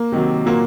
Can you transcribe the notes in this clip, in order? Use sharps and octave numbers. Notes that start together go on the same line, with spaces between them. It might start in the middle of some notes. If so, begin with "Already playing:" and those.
Already playing: A#3
C3 D#3 F#3
A#2 F#3 A#3